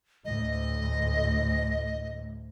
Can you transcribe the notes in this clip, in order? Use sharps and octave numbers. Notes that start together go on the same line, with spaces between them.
D2 A2 D#5